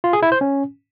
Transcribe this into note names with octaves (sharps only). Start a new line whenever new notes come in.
F4
G#4
E4
C5
C#4